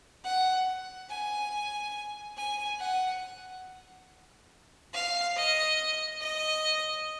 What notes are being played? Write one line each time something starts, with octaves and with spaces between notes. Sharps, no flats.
F#5
G#5
G#5
F#5
F5
D#5
D#5